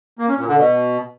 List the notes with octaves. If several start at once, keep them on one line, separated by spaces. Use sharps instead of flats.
A#3
C#4
A#2
D3
B2